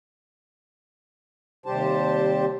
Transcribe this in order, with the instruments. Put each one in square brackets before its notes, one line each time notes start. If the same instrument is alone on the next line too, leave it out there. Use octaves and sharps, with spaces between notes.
[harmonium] D#2 C3 G3 G4 C5 A5